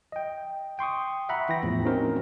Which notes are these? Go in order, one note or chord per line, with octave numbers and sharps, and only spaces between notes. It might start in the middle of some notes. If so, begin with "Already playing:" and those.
D#5 G5
G5 C6 C#6 D#6
E5 F#5 A#5 B5
E3 G5 A#6
E2 A2 F3
C4 C#4 D#4 F#4 A#4 C5